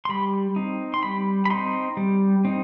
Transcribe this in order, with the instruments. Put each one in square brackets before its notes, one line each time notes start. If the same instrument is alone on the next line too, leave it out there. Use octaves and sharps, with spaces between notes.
[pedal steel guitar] C6
G3 B5
C4 D#4
C6
G3 B5
B5
C4 D#4 C6
G3
C4 D#4